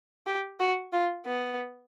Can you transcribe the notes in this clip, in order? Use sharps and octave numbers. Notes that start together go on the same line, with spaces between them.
G4
F#4
F4
B3